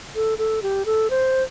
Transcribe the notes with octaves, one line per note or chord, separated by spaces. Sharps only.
A4
A4
G4
A4
C5